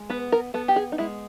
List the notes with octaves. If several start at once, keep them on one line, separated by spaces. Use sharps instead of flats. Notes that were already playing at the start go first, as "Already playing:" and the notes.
Already playing: G#3
B3 B4
A#4
B3 A4
G4
G#4
D#4
G#3 E4